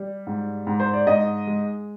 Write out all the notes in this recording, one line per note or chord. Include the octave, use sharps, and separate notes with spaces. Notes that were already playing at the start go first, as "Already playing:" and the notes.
Already playing: G3
G#2
G#2
C5
D5
G#2 D#5
G#3